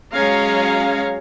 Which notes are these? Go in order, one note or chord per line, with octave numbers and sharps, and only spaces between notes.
F#3 G#3 C#4 C#5 F5 A#5